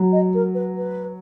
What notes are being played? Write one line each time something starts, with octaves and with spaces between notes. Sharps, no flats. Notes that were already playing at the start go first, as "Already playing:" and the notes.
Already playing: F#3
D#5
A#4
B4
B4